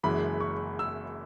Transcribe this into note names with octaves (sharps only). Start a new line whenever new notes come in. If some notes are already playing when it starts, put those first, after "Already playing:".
F#1 F#2 E3 G#3 B5
C#6
E6